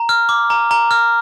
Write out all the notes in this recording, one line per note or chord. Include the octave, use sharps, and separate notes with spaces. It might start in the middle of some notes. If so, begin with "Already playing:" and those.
Already playing: A#5
F6
D6
A#5
A#5
F6